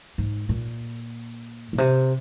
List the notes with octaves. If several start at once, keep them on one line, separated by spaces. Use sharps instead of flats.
G#2
A#2
A#2
C3